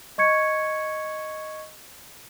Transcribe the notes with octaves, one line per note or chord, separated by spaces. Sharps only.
D#5 C#6 G#6 C#7